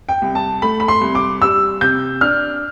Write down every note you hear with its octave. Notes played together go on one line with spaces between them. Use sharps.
G5
C2
A5
A3 B5
B5
C6
C2
D6
G3 E6
C3 G6
D4 F6